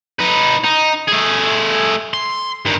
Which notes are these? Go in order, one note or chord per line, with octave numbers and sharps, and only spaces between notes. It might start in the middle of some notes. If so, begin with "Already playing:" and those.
D#4 B4
D#4
A3 G#4
C6
G2 D#3